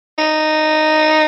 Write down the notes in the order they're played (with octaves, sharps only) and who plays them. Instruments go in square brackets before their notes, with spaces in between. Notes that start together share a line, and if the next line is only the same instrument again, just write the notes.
[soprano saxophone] D#4